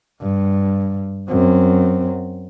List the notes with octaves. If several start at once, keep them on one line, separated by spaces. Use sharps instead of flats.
G2
F#2 C4